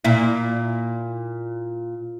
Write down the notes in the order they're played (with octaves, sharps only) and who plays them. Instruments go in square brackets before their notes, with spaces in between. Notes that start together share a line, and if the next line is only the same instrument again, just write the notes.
[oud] A#2 E4